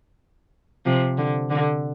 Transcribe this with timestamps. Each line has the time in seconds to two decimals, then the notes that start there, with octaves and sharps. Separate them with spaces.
0.85 C3 F3
1.18 D3
1.50 D3